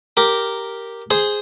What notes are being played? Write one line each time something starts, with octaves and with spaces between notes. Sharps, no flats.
G4 A#4
G#4 C5